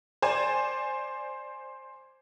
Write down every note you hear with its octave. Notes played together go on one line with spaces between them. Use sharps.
C5 D5 G#5